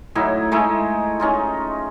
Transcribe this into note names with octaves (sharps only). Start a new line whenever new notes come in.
A2 F#3 D#4 E4
G#3 A3 D#4 E4
C#4 D#4 F4